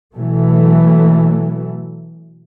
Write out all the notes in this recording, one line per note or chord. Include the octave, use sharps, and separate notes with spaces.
B2 E3 F#3 A3